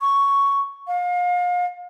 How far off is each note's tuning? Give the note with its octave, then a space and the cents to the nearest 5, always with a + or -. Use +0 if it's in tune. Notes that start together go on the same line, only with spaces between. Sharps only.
C#6 +5
F5 +35